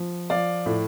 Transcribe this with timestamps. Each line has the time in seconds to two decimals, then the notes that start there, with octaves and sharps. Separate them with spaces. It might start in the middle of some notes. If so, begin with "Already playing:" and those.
Already playing: F3
0.30 F3 D5 F5
0.66 A2